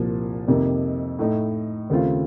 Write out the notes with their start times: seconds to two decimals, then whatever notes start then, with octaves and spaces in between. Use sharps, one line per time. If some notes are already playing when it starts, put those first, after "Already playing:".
Already playing: C2 A#2 F3
0.48 F2 C3 D#3 A#3 D#4
1.19 A2 A3 D#4
1.90 D#2 C#3 A3 C4 F4